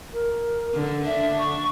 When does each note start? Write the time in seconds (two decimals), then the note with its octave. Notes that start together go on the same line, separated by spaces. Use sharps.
0.13 A#4
0.74 D3
1.05 D3 D4 E5
1.39 C#6